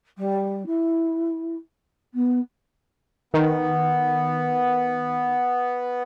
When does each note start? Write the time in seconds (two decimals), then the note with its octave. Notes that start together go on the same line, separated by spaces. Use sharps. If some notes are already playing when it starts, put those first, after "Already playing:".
0.17 G3
0.66 E4
2.13 B3
3.34 D#3 B3